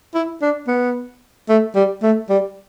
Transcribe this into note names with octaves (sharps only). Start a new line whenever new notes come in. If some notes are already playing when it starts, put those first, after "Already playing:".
E4
D4
B3
A3
G3
A3
G3